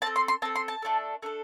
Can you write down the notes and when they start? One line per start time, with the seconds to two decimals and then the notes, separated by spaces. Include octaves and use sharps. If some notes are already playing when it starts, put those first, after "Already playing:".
0.02 C4 A4 A5
0.16 C6
0.28 C6
0.42 C4 A4 A5
0.56 C6
0.68 A5
0.82 A3 D4 A4
1.22 A3 D4 A4